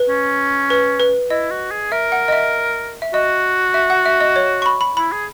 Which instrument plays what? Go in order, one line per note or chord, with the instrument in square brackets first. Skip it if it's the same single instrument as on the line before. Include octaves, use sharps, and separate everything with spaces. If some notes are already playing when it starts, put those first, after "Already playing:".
Already playing: [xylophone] B4
[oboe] C#4
[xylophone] B4
B4
[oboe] E4 [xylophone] D#5
[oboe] F#4
G#4
[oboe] A#4 [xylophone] E5
[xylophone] F#5
D#5
E5
E5
[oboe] F#4 [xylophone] D#5
[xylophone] E5
F#5
E5
D#5
C#5
C#6
B5
B5
[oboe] E4 [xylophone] B5
[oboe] G#4